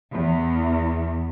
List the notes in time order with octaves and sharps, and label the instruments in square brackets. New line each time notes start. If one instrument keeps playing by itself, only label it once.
[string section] E2